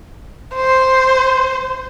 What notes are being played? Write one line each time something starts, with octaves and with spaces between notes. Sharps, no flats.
C5